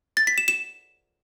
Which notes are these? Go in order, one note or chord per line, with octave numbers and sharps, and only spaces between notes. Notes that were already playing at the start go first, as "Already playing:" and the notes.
A6
B6
E7
E7